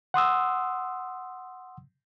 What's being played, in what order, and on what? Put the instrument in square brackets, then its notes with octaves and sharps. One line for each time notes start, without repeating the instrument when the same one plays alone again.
[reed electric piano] F#5 C6 D#6 E6